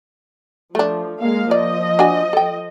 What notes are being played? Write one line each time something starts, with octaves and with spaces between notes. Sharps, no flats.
F3 A3 D4
G#3 A#3 F5
F3 D5 D#5
D4 F#4 G#5
A4 G5